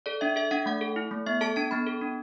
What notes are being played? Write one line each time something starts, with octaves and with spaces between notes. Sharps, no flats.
A4 D5
D4 E5
A4 E5
D4 F#5
A3 F#5
A4
E4
A3
B3 E5
A4 A5
D4 A5
B3 B5
A4
D4